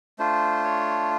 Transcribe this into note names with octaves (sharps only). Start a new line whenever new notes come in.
A3 D4 F4 C5
C#5